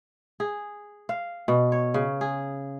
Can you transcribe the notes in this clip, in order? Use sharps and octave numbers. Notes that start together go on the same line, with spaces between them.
G#4
F5
B2
C#5
C#3
G#4